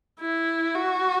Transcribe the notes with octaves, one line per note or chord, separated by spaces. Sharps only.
E4
F#4